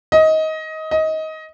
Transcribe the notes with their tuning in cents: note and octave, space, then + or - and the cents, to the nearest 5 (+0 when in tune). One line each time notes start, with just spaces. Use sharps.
D#5 +20
D#5 +20